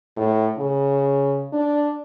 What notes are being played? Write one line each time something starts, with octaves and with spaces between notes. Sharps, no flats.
A2
C#3
D4